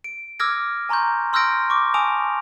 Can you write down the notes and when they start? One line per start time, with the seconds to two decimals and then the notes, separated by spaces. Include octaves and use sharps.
0.04 D7
0.39 D6 E6 F6 G#6 A#6 D7
0.89 G#5 A#5 C6 C#6 G6
1.33 C6 E6 F6 G6 A#6 D7
1.70 C#6 D6
1.94 G#5 A5 D#6 D7 F7